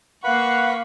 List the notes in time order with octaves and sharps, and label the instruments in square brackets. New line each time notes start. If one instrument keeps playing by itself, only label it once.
[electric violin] A#3 C#6 [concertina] B4 B5 [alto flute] F5 [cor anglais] F#5